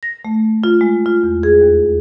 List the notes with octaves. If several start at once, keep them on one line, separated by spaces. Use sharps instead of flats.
A#6
A3
F4
G#3
F4
E2
G#4
D#2